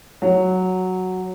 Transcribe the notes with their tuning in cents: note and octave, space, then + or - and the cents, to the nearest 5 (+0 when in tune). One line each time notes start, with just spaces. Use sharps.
F#3 +0 F#4 +0